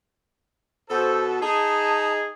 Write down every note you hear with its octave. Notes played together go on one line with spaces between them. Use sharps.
B2 F#4 A4 C5
D#4 G#4 A5